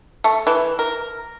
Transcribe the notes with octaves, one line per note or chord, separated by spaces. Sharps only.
A3
E3
A#4